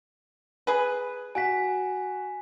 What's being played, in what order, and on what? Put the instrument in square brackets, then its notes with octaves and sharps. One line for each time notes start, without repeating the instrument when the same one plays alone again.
[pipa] G#4 B4
[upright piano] F#4 F#5 [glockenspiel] G#5 B6